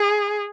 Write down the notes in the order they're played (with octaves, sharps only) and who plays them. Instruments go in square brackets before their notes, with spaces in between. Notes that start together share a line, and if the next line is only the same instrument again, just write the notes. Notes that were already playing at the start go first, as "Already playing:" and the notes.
Already playing: [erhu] G#4